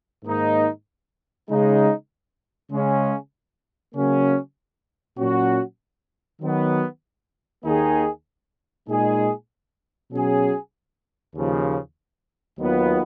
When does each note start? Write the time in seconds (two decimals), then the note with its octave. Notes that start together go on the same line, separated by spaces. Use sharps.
0.24 G#2 D#3 A#3 D#4
1.48 C#3 G#3 D#4
2.71 C#3 G#3 C#4
3.94 C#3 F#3 A#3 C#4
5.18 A#2 F#3 C#4 F#4
6.41 D#3 F#3 B3
7.64 D#2 D#3 A#3 D#4 G#4
8.87 A#2 G#3 D#4 G#4
10.11 B2 F#3 C#4 G#4
11.34 D#2 C#3 F3
12.58 D#2 D#3 F#3 B3 F4